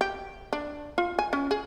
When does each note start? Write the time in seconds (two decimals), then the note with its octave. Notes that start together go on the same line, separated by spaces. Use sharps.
0.01 G4
0.53 D4
0.98 F4
1.19 G#5
1.33 C#4
1.51 G#4